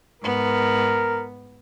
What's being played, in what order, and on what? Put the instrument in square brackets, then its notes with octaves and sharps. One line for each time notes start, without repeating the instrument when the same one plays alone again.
[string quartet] G#2 B3 [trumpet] A#4